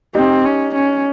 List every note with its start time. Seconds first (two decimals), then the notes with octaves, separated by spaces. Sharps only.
0.15 C4 D#4 G4
0.45 C#4
0.75 C#4